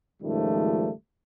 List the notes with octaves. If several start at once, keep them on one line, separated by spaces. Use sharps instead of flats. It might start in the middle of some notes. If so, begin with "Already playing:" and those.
C#2 G#2 D#3 F3 G3 A3